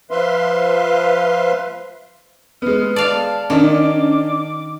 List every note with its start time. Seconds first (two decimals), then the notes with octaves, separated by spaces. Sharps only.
0.11 F3 B4 E5 F5 C6
2.62 G#3 B3 F6
2.96 D5 F5 A5
3.50 D#3 C#4 D4 D6